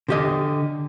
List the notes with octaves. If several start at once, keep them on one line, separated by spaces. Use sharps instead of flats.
D3 G4 D#5